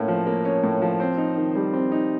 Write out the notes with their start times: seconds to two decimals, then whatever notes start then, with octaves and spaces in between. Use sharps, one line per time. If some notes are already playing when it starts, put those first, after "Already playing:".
Already playing: A2 A#3 C#4
0.08 F3
0.26 A#3
0.45 C#4
0.63 A2
0.82 F3
1.00 C4
1.18 D#4
1.37 D#3
1.55 G3
1.73 C4
1.92 D#4